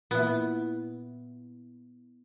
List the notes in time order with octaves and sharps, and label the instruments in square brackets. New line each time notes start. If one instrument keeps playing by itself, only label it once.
[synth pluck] A#2 E4 [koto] B3